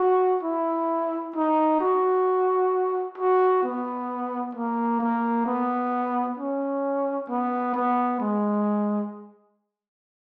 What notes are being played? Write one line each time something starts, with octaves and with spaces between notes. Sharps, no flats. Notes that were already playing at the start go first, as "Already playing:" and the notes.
Already playing: F#4
E4
D#4
F#4
F#4
B3
A#3
A#3
B3
C#4
B3
B3
G#3